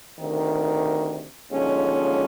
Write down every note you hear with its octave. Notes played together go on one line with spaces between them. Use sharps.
D2 C3 D#3
D#2 D3 F3 G#3 C#4